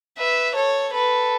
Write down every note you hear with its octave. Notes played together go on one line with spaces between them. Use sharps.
B4 E5
A4 C#5
A4 B4